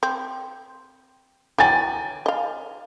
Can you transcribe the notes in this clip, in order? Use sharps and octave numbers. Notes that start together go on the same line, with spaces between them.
C4
E3 F#3 G5 G#5 A6
D#5 F5